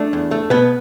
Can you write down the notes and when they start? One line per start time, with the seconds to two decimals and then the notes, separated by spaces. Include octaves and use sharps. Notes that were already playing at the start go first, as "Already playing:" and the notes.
Already playing: A3 D4
0.13 E2
0.31 A3
0.50 B2 B3 B4